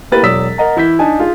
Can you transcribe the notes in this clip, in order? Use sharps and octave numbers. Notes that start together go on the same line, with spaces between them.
A#3 E4 G4 B4 A6
E1 F#3 D5 D#6 E6 B6
A#4 D#5 F#5 A#5
E3 E4 G6 B6
D4 D#4 G#5 A5
F4 G#4